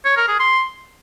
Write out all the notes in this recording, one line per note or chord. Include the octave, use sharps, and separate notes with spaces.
C#5
A#4
G#4
C6